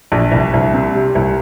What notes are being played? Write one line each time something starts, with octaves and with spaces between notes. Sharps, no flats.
A#1
C2
C2
C3
G3
C2